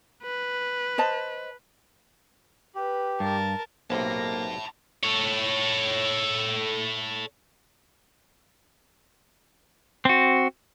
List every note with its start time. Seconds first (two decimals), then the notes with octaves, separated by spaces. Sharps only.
0.23 B4
0.98 C5 D#5 A5
2.75 G4 B4
3.20 G2 A#4 A5
3.90 B1 C3 A#3 A#4 C5 A5 B5
5.03 A4 C#5
10.05 C4 F#4